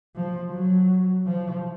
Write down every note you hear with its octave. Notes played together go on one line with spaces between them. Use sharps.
F3
F#3
F3